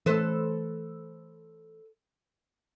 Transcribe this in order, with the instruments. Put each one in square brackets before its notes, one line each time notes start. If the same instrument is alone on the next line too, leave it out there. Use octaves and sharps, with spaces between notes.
[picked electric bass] E3 A3 [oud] A4 B4 C5